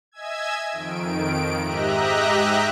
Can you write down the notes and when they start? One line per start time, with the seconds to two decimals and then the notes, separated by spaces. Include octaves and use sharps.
0.12 D#5 E5 G#5 E6 G#6
0.71 F2 D#3 D7
1.60 G#2 G4 D#5 E5 A#5 F#6